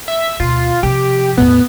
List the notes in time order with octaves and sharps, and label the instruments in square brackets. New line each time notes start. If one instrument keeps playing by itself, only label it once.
[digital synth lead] E5
[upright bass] D2 B2 [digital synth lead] F4
[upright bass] C3 F3 [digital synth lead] G4
[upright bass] E2 A2 [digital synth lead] B3